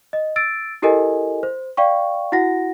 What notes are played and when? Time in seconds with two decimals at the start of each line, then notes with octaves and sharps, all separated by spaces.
0.13 D#5
0.36 E6 A6 D7
0.82 E4 G4 A4 A#4 D#5 G#5
1.43 C5
1.77 D5 F5 G5 C#6
2.32 E4 F#4 F#5 A#6